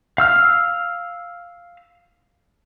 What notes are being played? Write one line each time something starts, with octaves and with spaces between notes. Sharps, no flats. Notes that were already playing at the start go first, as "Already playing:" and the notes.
F5 E6 F6